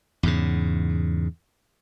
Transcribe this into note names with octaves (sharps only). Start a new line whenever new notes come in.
E2 G#2 C#3